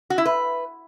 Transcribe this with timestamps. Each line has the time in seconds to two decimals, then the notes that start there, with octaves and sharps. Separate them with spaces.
0.10 F#4
0.18 E4
0.26 B4